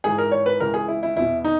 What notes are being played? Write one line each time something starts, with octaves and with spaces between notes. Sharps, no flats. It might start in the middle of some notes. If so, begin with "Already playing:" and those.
G#2 E3 G#4
A#4
C#5
B4
C#2 C#3 E3 A#4
G#4
E4
E4
E2 B2 E4
D#4